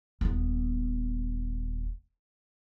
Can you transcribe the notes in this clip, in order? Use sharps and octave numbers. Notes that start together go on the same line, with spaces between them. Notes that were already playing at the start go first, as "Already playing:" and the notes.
D#1 B3